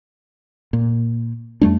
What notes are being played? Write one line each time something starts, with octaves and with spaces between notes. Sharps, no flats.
A#2
F2 G3 A3 D4